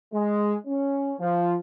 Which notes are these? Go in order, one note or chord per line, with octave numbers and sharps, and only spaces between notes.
G#3
C#4
F3